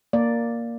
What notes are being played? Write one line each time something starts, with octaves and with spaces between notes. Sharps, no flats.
A#3 D5